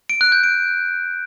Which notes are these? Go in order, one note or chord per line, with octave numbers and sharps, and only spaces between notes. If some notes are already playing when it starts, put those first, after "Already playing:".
D7
F#6
G6
D7